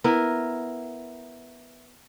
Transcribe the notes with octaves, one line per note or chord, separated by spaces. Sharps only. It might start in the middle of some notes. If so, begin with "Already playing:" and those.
B3 E4 A#4